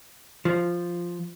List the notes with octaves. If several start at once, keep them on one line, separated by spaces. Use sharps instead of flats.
F3